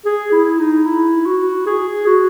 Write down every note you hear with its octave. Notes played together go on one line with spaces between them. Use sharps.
G#4
E4
D#4
E4
F#4
G#4
F#4